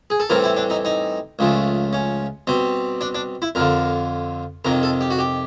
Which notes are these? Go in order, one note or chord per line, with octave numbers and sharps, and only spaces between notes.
G#4
A4
A2 E3 G3 C4 A#4
E4
D4
D#4
D#4
C#2 C#3 F3 A3
C#4
B2 G3 C4
D4
D4
E4
F2 D3 F3 A#4
F2 C3 D#3 A#4
A4
G4
F#4
G4